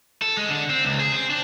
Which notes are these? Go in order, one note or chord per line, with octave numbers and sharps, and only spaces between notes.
A4
G#3
D3
C4
C#2
G#4
C4
D4